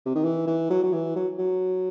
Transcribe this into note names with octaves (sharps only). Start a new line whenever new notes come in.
C3
D#3
E3
E3
F#3
F#3
E3
F#3
F#3